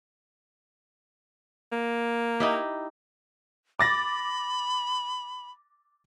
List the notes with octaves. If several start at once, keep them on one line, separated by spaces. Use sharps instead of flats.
A#3
D#4 E4 G4
B5 D6 A6 A#6